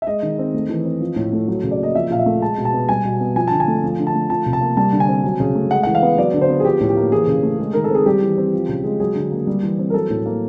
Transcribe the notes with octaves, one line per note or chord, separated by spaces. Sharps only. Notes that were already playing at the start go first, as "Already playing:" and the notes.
E5
G#3 D#5
D#3
C4
A3
E3
C4
F3
A2
A3
F#3
C#3
D5
A#3 D#5
F3 E5
A#2 F5
E5
A3
G#3 A5
B2
A5
B3
G3 G#5
B2
B3
F3 G#5
D3 A5
G#5
A3
F3
D3
A5
A3
F3 A5
C3
A5
A#3
G3 A5
D3
G#5
C4
F#3
C#3
A3
G#3 F#5
E3 F#5
F5
B3
F#3 D5
D3
C5
B3
G#4
F3 G4
A2
G4
A#3
E3 G#4
C#3
A3
G#3
D#3 A#4
A4
C4 G#4
G3 G4
E3
C4
F3
C#3
G#3
F#3 G#4
D3
A#3
G3
E3
C4
A#4
F#3 A4
A2
A#3